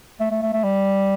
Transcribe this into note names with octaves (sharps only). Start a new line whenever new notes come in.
A3
A3
A3
A3
G3